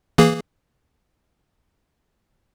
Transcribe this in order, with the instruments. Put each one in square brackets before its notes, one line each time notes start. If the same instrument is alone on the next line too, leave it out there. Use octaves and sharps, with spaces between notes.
[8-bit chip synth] E3 A#3 G#4